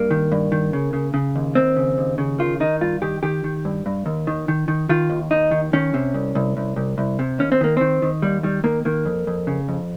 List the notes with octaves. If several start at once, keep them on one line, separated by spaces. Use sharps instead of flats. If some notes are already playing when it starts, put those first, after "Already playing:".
Already playing: G2 A#3
D#3
G2
D#3
C#3
C#3
C#3
D#2
D#2 C4
C#3
D#2
C#3
D#3 F4
D#3 D#4
G2 F4
D#3 G4
D#3 G4
D#3
G2
G2
D#2
D#3
D#3
D#3
D#3 F4
D#2
D#2 D#4
D#3
D#3 C#4
C3
C2
C2
C2
C2
C2
C3
D#2 C#4
C4
D#3 A#3
D#3 C4
D#3
D#2 G3
D#3 G3
D#3 A#3
D#3 A#3
F2
F2
C#3
F2